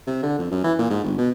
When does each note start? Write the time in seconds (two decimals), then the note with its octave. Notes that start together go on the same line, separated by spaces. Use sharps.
0.07 C3
0.23 D3
0.39 F2
0.51 F#2
0.64 E3
0.79 A#2
0.90 G#2
1.04 G1
1.18 B2